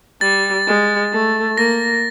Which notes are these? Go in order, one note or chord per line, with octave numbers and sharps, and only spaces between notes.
G3 A6
G#3
A3
A#3 A#6